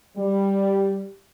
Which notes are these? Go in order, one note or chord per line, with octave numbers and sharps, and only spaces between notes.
G3